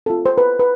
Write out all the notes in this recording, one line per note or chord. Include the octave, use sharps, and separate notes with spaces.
C4 F4 A4
C5
B4
B4